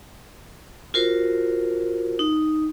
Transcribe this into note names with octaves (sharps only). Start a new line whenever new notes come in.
F4 F#4 A#4 C5
D#4